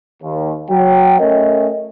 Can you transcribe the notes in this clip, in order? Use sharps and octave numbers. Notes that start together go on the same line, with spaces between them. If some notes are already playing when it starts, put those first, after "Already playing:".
D#2
F#3 G5
A3 C#4 A#4 D#5